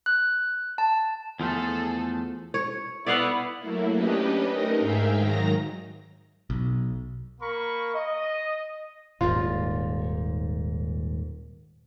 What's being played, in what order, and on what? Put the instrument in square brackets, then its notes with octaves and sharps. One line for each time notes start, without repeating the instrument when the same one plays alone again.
[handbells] F#6
A5
[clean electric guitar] E2 F3 A3 [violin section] G#4 A4
[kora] C#5
[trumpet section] B3 E4 [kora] D5 F5 F#5
[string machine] F#3 A3 A#3 E4
C#4 D4 G4 B4 D#5
A3 D#4 A#4 D#5
G#2 G#4 E5 F5 G5
G#2 D#3 F#3 A#5 A#6
[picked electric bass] B1
[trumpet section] A#3 A#4 B5 C#6
D#5
[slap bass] D#1 G#2 [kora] F4